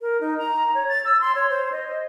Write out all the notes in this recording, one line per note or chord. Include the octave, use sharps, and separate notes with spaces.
A#4
D#4
A#5
C#5
A6
E6
C6
C#5
C5
D#5